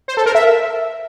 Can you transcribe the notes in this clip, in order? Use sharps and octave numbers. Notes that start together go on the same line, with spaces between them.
C5
A4
A#4
E5